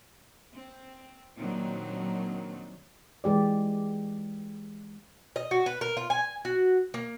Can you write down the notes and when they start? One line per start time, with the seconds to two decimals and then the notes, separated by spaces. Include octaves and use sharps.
0.54 C4
1.38 A#2 D#3 F#3 C4 D4
3.24 E3 G#3 G4 D5
5.36 D#5
5.51 F#4
5.66 B4
5.81 A#4
5.97 F4
6.10 G#5
6.45 F#4
6.94 A#3